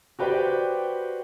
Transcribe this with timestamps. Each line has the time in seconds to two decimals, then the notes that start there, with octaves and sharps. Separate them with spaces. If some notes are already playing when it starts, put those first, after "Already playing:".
0.19 F#4 G4 B4 C5 D5 G5